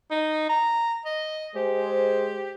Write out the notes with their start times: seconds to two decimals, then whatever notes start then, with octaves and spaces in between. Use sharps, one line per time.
0.11 D#4
0.49 A#5
1.05 D#5
1.56 G#3 G4 C5